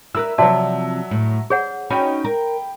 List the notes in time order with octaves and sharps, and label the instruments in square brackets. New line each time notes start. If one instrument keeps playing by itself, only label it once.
[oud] E4 A#4 B4 [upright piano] E6
[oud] C3 F3 [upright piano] F#3 E5 [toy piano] F#4 D5 A5
[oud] A2
[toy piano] G#4 C#5 F#5 [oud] C5
[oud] C#4 D#4 F#4 [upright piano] G5 B5
[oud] A#4